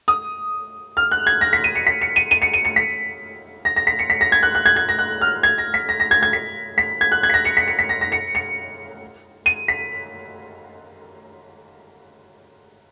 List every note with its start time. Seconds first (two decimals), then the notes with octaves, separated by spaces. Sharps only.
0.08 D#6
0.97 F6
1.11 F#6
1.27 G#6
1.41 A#6
1.53 B6
1.64 D#7
1.75 C#7
1.87 B6
2.01 C#7
2.16 D#7
2.31 D#7
2.42 C#7
2.54 D#7
2.65 C#7
2.76 B6
3.65 A#6
3.76 A#6
3.87 B6
3.99 C#7
4.10 B6
4.21 A#6
4.32 G#6
4.43 F#6
4.55 F#6
4.66 G#6
4.76 G#6
4.89 A#6
4.99 F#6
5.21 F6
5.43 G#6
5.58 A#6
5.74 B6
5.89 A#6
6.00 A#6
6.11 G#6
6.23 G#6
6.33 B6
6.78 B6
7.01 G#6
7.12 F#6
7.23 G#6
7.30 B6
7.34 A#6
7.45 C#7
7.57 B6
7.68 C#7
7.79 B6
7.89 A#6
8.01 A#6
8.12 C#7
8.35 C#7
9.46 D#7
9.68 B6